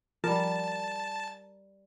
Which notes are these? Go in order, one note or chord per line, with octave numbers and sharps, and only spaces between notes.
F3 G3 A#4 A5